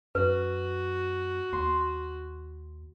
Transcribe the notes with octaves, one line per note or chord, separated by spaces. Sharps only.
F#2 F#4 B4
D#2 C6